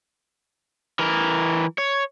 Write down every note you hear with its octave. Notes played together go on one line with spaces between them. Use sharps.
E3 A#4
C#5